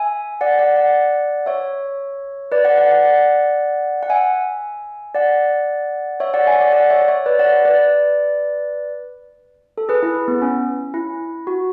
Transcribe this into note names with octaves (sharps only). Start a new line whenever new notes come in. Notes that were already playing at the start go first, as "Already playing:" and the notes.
Already playing: E5 G#5
D5 F#5
D5 F#5
D5 F#5
C#5 E5
B4 D5
D5 F#5
D5 F#5
D5 F#5
D5 F#5
F#5
E5 G#5
D5 F#5
C#5 E5
D5 F#5
E5 G#5
D5 F#5
D5 F#5
C#5 E5
C#5 E5
B4 D5
D5 F#5
B4 D5
A4
G#4 B4
E4
B3
C#4
E4
F#4